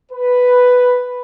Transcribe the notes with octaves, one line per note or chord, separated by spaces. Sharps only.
B4